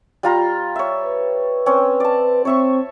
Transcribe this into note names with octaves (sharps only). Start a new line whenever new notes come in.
G3 F4 A#5
C#5 E5
B4
C4 C#4 C#5
D5 A5
C4 C#5 E5 C#6